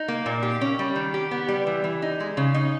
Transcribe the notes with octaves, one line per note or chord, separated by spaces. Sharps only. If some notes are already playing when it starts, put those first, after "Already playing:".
Already playing: D#4
A#3
A#2
G4
C#4
G3
D#3
G4
B3
G3
E3
E3
D#4
G#3
C#3
D#4